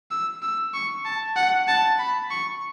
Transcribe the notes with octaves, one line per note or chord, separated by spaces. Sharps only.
E6
E6
C#6
A5
F#5
A5
B5
C#6